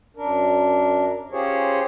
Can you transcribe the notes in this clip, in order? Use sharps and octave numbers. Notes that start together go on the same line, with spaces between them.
F#2 D4 A#4
C#4 F4 G4 G#4 C5 C#5